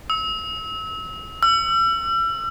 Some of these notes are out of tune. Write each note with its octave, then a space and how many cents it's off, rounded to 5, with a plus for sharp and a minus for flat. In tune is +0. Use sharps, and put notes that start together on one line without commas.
E6 -30
E6 +40